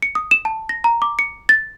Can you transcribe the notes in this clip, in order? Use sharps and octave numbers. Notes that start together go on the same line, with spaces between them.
C#7
D#6
E7
A5
A#6
A#5
D6
C#7
A6